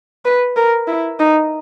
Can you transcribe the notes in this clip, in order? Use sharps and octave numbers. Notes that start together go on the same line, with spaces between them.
B4
A#4
E4
D#4